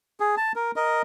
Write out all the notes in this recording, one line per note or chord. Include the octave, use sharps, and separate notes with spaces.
G#4
A5
A#4
A#4 D#5